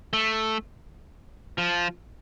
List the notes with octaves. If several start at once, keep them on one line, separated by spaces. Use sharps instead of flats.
A3
F3